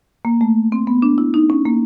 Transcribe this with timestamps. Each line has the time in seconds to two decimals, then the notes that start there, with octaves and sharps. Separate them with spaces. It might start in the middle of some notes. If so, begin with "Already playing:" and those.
0.25 A#3
0.41 A3
0.72 C4
0.87 B3
1.02 D4
1.18 E4
1.34 D#4
1.50 C#4
1.65 A#3